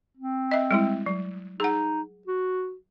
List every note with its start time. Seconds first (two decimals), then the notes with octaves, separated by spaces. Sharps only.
0.17 C4
0.51 D#5 E5
0.71 G3 G#3 E4
1.06 F#3
1.60 D#4 G#4 F#5
2.27 F#4